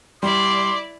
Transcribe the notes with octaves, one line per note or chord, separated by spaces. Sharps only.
G3 E4 D5 C6 D6